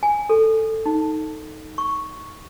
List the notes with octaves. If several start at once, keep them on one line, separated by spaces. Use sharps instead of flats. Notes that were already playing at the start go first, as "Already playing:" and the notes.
G#5
A4
D#4
C#6